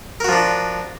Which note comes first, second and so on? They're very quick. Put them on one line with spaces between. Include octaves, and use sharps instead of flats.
A#4 F#4 F3 D4